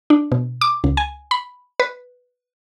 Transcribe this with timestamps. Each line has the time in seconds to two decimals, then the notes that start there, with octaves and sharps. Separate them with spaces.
0.10 D4
0.32 B2
0.61 D6
0.84 C#2
0.97 G#5
1.31 B5
1.80 B4